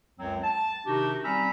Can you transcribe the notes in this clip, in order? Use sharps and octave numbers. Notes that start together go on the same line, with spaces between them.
C#2 F#2 F#3 C4
A5
C3 D#3 D4 D#4 F#4 G4
G3 C4 C#4 A#5 B5 E6